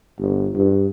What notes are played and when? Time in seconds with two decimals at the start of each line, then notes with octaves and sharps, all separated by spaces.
0.18 G1
0.55 G2